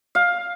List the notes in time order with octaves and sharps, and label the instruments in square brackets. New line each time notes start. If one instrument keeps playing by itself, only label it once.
[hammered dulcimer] F5